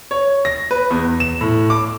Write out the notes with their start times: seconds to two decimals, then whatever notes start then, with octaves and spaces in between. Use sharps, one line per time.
0.11 C#5
0.45 A#6
0.71 B4
0.90 E2
1.20 E7
1.41 A2
1.70 D6